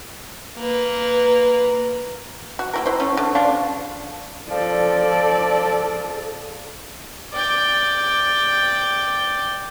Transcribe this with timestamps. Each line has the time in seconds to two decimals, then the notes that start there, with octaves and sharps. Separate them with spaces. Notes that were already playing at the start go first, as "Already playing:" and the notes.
0.58 A#3 B4
2.59 F#4
2.73 A#3 E4 A#4
2.86 E4 C5
3.00 A3 C#4
3.17 D3
3.35 C#3 D4 F4
4.51 F3 A4 D5
7.34 D5 G5